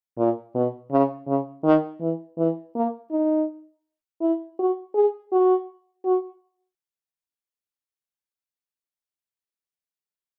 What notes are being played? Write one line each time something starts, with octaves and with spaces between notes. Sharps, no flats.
A#2
B2
C#3
C#3
D#3
E3
E3
A#3
D#4
E4
F#4
G#4
F#4
F#4